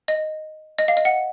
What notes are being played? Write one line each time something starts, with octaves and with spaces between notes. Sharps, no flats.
D#5
D#5
F5
D#5
F#5